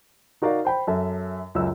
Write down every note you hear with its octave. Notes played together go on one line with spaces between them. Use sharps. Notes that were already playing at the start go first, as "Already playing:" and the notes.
D#4 F#4 A#4 D5 F5
C5 G5 B5
F#2 A4 E5
C#2 F#2 E6